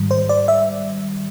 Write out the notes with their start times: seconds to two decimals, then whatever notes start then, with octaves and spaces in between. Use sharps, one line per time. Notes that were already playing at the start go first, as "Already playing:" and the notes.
Already playing: G#2 D#3 G3
0.11 C5
0.29 D5
0.48 E5